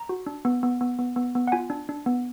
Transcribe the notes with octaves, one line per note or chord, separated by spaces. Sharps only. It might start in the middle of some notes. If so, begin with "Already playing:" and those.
Already playing: A#5
F#4
D4
B3
B3
B3
B3
B3
B3
F#5
F4 G#5
D4
D4
B3